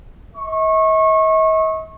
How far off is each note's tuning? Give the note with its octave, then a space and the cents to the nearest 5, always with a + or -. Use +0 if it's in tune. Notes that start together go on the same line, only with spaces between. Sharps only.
D#5 +45 C#6 -25